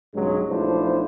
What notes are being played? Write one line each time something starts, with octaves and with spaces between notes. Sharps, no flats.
B1 G2 C#3 F#3 G#3
B1 F3 A3 D4 E4 C5